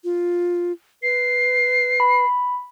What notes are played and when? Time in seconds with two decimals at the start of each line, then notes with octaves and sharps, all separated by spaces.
0.04 F4
1.03 B4 C7
2.00 B5